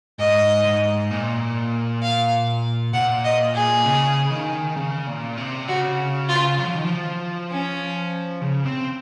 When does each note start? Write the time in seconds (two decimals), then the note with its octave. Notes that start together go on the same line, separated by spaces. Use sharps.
0.19 G#2 D#5
0.65 G#2
1.11 A#2
2.02 F5
2.93 A#2 F#5
3.24 D#5
3.54 G#4
3.85 C#3
4.31 D#3
4.76 C#3
5.07 A#2
5.37 C3
5.68 C#3 F#4
6.29 F4
6.59 F#3
6.68 F3
6.76 D#3
6.85 F3
7.51 C#4
8.42 C#3
8.65 C4